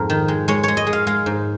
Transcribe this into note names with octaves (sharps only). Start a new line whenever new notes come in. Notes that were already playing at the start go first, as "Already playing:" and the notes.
Already playing: F2 G#2 A#4
D#3
G#3
G#3 C#5
G#3 C#5
D#5
G#3
F5
G#3 F5
G#2